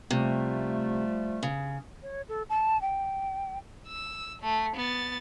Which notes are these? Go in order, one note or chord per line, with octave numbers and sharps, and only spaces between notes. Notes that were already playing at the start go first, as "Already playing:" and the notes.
C3 F3 G3 A3
C#3
C#5
A4
A5
G5
E6
A3
B3 A6